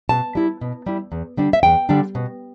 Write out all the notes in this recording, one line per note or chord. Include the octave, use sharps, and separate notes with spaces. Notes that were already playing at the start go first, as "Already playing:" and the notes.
B2 A5
G3 E4
B2
G3 E4
E2
D3 G3 D4
E5
E2 G5
D3 G3 D4
B2